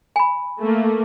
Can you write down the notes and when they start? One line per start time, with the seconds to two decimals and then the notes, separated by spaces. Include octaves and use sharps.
0.16 G#5 B5
0.59 A3 A#3